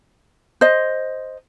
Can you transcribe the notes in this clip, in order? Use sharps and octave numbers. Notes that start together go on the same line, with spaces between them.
C5 D#5